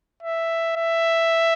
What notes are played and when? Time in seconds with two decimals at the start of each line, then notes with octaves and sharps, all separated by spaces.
0.23 E5
0.76 E5